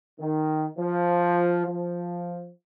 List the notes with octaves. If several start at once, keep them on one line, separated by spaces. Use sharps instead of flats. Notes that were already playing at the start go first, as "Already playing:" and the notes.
D#3
F3
F3